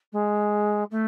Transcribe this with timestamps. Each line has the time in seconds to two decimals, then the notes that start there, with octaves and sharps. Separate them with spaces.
0.12 G#3
0.91 A3